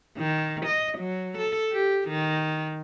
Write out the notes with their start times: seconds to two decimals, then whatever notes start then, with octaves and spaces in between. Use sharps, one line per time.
0.18 D#3
0.66 D#5
0.98 F#3
1.38 A4
1.72 G4
2.09 D#3